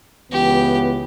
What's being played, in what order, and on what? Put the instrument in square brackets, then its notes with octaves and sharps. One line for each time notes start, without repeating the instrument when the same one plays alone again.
[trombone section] C#2 E3 B3 [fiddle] G4